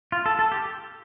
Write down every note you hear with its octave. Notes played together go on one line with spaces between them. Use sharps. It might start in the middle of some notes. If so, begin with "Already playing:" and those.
F4
A4
A4
G4